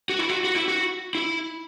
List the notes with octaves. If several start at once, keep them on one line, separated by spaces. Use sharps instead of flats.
F#4
E4
F#4
F#4
E4
F#4
E4